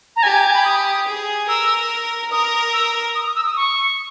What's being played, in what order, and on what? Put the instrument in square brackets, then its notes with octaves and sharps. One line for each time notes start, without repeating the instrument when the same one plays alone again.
[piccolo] A#5
[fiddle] G4 [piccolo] G#5
[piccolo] G#5
G#5
B5
D#6
[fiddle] G#4
[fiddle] A#4 [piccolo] E6
[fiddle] A#4 [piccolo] D#6
[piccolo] E6
D#6
D#6
E6
D#6
C#6